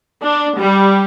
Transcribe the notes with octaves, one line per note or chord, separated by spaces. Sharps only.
D4
G3